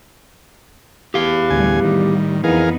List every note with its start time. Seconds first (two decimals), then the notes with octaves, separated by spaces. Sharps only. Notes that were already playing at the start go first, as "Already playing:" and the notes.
1.14 E2 G4 F5
1.50 D2 A2 G3 G#5
1.84 D#3
2.44 F2 E3 B3 D#4 G#4 A#4 F5